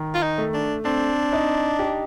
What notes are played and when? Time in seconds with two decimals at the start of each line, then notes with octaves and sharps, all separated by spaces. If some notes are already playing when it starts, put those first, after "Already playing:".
Already playing: D#3
0.14 F4
0.23 D#4
0.38 A3
0.54 D4
0.85 C4 D4
1.33 D#4
1.79 G4